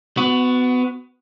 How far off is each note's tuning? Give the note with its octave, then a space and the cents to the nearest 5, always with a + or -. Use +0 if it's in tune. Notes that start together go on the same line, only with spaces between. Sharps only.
B3 +25 F#4 +0